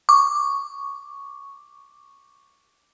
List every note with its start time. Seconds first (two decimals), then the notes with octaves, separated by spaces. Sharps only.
0.09 C#6 D6